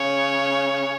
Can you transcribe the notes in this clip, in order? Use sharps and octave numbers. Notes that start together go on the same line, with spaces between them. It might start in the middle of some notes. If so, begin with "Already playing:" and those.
Already playing: C#3 C#5